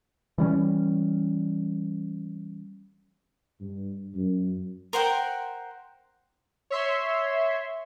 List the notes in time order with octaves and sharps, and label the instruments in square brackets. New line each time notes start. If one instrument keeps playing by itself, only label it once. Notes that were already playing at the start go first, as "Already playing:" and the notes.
[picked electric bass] E3 G3 C#4
[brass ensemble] G2
F#2
[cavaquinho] A#4 C5 F#5 G5
[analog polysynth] C#5 E5 C6